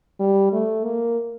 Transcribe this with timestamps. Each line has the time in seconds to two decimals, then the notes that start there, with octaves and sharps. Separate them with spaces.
0.20 G3
0.53 A3
0.84 A#3